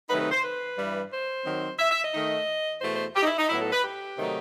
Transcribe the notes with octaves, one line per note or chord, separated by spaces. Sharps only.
C3 D#3 F#3 A3 D#4 B4
B4
C5
B4
G2 E3 G3
C5
D#3 F#3 C4
E5
E5
D#5
D#3 A3 D#4
E2 B2 A3 C5
C5
G4
D#4
E4
D#4
A2 F#3 B3 E4
A4
B4
G4
C3 D#3 F#3 A3 D#4